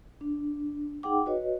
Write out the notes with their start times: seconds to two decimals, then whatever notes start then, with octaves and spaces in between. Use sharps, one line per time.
0.21 D4
1.03 D#4 G#4 F#5 G5 D6
1.26 F#4 B4 C#5 D#5